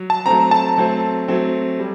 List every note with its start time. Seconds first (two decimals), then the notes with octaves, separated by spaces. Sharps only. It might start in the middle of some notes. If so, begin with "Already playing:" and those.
Already playing: F#3
0.10 A5
0.26 F#3 A3 C4 A#5
0.51 A5
0.77 F#3 A3 C4
1.28 F#3 A3 C4
1.79 G3